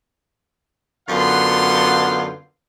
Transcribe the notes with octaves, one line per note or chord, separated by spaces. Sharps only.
F#2 D3 B3 F4 F5 C6